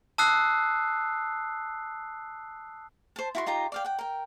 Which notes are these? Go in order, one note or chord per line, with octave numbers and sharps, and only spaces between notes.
A5 D#6 E6 F#6 C7
C5 A5
E4 F#4 C6
D#4 F4 G4 A#5
D5 F5 G5
F#5 G5
A#4 G5